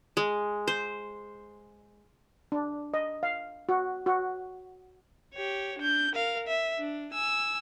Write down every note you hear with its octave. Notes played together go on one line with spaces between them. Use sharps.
G#3
C5
D4
D#5
F5
F#4
F#4
G4 C#5
D4 G6
A#4 F5
E5
D4
G#5 E6